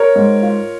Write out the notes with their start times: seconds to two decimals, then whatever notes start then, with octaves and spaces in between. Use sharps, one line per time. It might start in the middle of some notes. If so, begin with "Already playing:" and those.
Already playing: A#4 C#5
0.16 G#2
0.42 F4